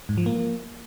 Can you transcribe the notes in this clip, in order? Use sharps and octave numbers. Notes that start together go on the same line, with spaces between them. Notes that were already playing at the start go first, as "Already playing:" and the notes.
G#2
F3
A#3